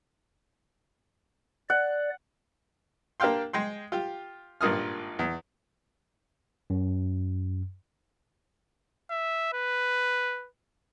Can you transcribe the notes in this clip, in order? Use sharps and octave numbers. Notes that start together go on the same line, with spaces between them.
D5 F#5
A#3 D4 G4 F5 G5 C6
G#3 G5 C6
F4 G4
G#1 G2 A#2 D#6 F6
E2
F#2
E5
B4